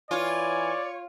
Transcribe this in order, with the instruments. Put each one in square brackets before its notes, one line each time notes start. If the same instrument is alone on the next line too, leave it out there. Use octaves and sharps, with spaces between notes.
[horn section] E3 G#5 [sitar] F4 [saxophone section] C#5 [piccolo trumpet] D5